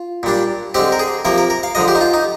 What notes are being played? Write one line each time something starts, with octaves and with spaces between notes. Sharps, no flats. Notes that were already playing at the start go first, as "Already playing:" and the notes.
Already playing: F4
A#2 G3 D4
D3 G#3 C4 G4
A#4
G#4
C3 F3 A#3 A#4
A#4
A#4
F5
D3 F3 G#3 D#5
G4
D#4
F4
D#4